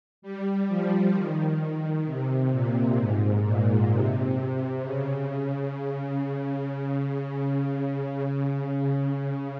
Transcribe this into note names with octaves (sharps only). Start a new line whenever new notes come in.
G3
F3
D#3
C3
A#2
G#2
A#2
C3
C3
C#3